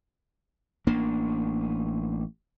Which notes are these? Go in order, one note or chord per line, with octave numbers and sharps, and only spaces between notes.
A1 A#3 D4